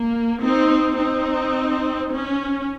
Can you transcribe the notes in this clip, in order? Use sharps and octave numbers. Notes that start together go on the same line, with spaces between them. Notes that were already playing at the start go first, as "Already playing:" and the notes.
Already playing: A#3
C4 D#4
C4 D#4
C#4